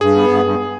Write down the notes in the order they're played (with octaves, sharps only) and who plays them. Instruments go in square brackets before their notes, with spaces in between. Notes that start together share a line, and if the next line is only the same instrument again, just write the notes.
[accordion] G2 [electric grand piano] G#4
[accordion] B3
G2
G2